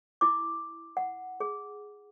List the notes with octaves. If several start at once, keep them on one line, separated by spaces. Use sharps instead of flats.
E4 D6
F#5
G#4